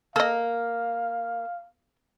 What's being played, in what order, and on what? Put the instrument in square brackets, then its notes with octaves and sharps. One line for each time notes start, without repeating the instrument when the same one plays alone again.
[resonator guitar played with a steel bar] A#3 [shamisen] A4 D#5 [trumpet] F5